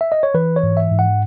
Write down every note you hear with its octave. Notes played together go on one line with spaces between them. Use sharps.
E5
D#5
C#5
E3 B4
C#5
G#2
E5
G#2
F#5